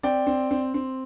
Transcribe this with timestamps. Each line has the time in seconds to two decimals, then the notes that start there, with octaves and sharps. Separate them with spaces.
0.03 C4 D5 G5
0.27 C4
0.51 C4
0.74 C4